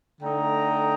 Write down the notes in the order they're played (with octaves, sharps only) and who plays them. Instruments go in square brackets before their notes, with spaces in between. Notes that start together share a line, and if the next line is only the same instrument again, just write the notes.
[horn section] D3 A3 D#4 G5 A#5